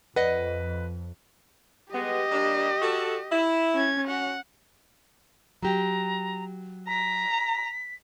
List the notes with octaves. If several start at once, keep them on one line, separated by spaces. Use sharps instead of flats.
F2 B4 D#5 F#5
G3 G#3 B3 G4 D#5
G3 A#3 D4
F#4 A4
E4
C#4 G#6
C#4 F#4 F#5
F#3 G4 A#5
A#5 B6